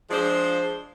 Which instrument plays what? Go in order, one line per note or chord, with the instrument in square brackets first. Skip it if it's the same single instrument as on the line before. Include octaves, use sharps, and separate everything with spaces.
[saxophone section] F3 G#3 D4 F4 C5